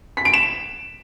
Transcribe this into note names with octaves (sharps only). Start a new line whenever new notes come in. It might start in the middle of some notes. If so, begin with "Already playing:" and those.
B6
D7
E7